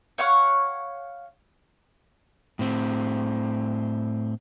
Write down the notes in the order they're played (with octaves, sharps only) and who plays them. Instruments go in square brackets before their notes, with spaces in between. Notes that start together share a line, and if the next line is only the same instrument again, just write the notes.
[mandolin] C#5 F5 F#5 C#6
[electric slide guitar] A2 C4